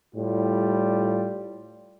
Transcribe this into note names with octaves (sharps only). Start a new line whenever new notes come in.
A2 G3 F4